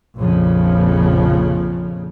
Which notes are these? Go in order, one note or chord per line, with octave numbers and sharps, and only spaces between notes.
A#1 F2 C#3 F3